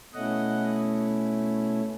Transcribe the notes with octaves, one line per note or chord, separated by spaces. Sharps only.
B2 A3 C#4 E4 D#5 F#5